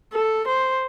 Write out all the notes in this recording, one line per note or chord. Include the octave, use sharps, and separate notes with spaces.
A4
C5